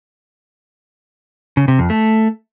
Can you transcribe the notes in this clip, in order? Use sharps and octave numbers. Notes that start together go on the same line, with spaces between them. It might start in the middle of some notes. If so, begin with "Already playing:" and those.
C#3
C3
F2
A3